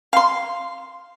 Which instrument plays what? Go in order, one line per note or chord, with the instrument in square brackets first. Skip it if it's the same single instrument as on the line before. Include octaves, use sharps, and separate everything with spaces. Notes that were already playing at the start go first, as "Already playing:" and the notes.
[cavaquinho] F5 C6